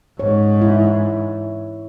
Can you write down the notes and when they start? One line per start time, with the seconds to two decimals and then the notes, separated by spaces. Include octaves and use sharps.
0.20 G#2 C#5
0.61 E4